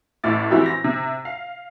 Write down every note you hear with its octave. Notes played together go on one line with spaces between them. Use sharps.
A1 A2 E4 D6 A6
E3 C4 E4 F#4 G4 A#4
A#6
C3
F5